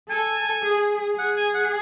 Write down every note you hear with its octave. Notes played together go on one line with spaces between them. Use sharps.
A4 G#5
G#4
G#4 F#5
G#5
F#5